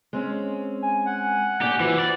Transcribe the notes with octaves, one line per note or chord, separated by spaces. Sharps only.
G#3 C4 C#4
G#5
F#5
A2 A#3 D4 G4
E3 F4 F#4 C5
D5